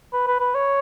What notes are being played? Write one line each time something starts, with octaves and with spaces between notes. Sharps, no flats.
B4
B4
B4
C#5